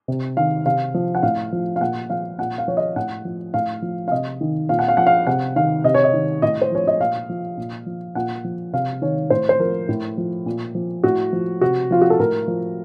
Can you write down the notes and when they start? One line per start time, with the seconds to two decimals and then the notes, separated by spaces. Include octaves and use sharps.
0.08 C3
0.37 D#3 F5
0.66 C3 F5
0.94 F3
1.15 F#5
1.23 A2 F5
1.52 F3
1.76 F5
1.80 A#2 F#5
2.10 F3 F5
2.38 A#2 F#5
2.58 F5
2.68 F3 C#5
2.77 D#5
2.96 A2 F#5
3.25 F3
3.54 A2 F5
3.82 F3
4.08 F5
4.11 C3 D#5
4.41 D#3
4.69 A#2 F5
4.79 F#5
4.88 F5
4.97 F3 F#5
5.07 F5
5.27 C3 F#5
5.56 D#3 F5
5.84 C3 D#5
5.94 C#5
6.04 D#5
6.13 D#3
6.42 A2 D#5
6.62 C5
6.72 F3 C#5
6.87 D#5
7.00 A#2 F5
7.29 F3
7.57 A#2
7.86 F3
8.15 A#2 F#5
8.44 F3
8.73 C3 F5
9.02 D#3 C#5
9.30 A2 C5
9.49 C5
9.59 F3 A#4
9.89 A2
10.18 F3
10.46 A#2
10.75 F3
11.04 A2 F#4
11.33 F3
11.61 C3 F#4
11.91 F3 F4
12.02 F#4
12.10 A4
12.19 A2 A#4
12.48 F3